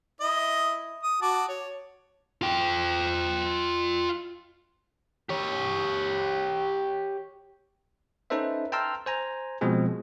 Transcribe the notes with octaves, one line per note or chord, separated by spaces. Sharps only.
E4 D#5
D#6
F#4 A5 D6
C#5
F4 G5
G4 C#5
C#4 D#4 A4 B4 C5 E5
G5 A5 A#5 C6 E6 F6
C5 G#5 A#5
B2 F3 G#3 C4 G#4